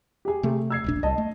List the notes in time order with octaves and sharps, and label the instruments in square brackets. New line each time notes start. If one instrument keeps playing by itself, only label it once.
[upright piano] G4 G#4
[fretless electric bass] C3 A3
[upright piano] E6 G#6 C7
[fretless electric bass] E1 A#1 D4
[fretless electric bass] C2 [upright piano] D#5 A5
[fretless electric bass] A3